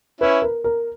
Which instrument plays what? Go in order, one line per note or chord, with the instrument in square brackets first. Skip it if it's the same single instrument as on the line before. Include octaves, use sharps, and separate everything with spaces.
[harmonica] C#4 E4 [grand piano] B4
[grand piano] A#4
A#4